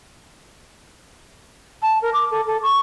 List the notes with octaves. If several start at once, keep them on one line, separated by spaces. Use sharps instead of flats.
A5
A#4
D6
A4
A4
C#6